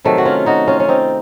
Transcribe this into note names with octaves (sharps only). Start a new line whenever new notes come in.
C3 D#3 F#3 A3
F#4
C#4 F4
D#4 F#4
C#4 F4
C#4
C4 D#4